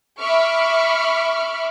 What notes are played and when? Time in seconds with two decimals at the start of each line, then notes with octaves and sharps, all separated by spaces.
0.19 E5 B5 C#6 D6 F6